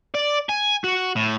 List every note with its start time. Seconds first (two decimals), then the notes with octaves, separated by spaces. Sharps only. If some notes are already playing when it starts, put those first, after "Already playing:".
0.15 D5
0.49 G#5
0.84 F#4
1.16 A2